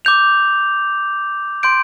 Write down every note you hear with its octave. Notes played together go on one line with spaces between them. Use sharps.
D6 G6 F7
C6 G6 D7